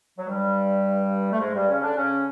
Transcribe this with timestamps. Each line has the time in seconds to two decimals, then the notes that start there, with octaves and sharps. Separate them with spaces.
0.18 F#3
0.27 G2 G3
1.31 A3
1.40 G#2 G#3
1.54 G2 G3
1.68 C#3 C#4
1.82 D3 D4
1.96 C#3 C#4